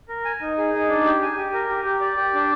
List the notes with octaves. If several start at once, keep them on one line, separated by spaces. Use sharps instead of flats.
A#4
G#5
D#4
G#4
D#4
D4
G4
G#5
G4
A#4
G4
G4
D5
G4
D4